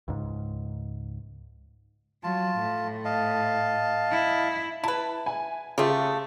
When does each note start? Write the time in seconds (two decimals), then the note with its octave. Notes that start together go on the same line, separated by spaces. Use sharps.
0.08 C#2 G#2
2.23 F#3 F4 A5
2.59 A2
3.05 D#5 F5 A5
4.12 E4
4.84 E4 B4 A5
5.26 G#5
5.78 C#3 A3 F4 G4